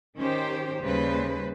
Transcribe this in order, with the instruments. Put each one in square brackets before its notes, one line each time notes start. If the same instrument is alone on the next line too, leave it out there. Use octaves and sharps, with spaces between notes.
[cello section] D#3 C#4 G4 C5
D#2 C#3 G3 B4 C5